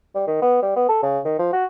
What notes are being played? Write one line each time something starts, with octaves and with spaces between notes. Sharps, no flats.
G3
D#3
B3
G3
B3
A4
C#3
D#3
F3
F#4